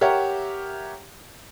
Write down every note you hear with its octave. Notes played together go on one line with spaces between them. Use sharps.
G4 A#4 C#5 E5 F#5